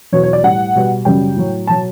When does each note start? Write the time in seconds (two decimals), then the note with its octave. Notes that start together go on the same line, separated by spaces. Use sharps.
0.12 E2 B2 F#3 C#5
0.23 C#5
0.33 D5
0.43 A2 G3 F#5
0.75 B2 G3
1.05 F#2 C#3 G3 G5
1.36 A2 F#3
1.67 B2 F#3 A5